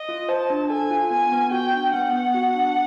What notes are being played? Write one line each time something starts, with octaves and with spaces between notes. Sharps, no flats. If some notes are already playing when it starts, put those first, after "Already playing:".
Already playing: D#5
F4
C5 A5
D4
A4 G#5
F4
B3 G#5
B3
F#4 G5
D4
B3 F#5
B3
F#4
D4